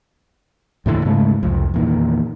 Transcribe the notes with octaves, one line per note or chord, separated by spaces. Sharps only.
D#2 A2 D3 E3
G#2 C#3 G#3 A3
C2 F2
E2 A#2 D#3